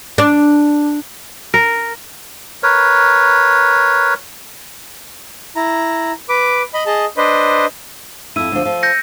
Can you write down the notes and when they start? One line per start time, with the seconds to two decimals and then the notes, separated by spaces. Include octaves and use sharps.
0.18 D4
1.54 A#4
2.63 A#4 B4 C#5
5.56 E4 A#5
6.29 B4 D6
6.74 D#5 B5
6.86 G#4 D#5 A5
7.17 D4 B4 C5 D#5
8.36 F2 E4 E6 D#7
8.52 D2 F3
8.65 F3
8.83 G6 A#6 C#7